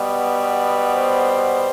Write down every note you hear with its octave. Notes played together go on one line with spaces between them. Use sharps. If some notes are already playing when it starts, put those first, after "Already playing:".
Already playing: B2 G3 B3
C5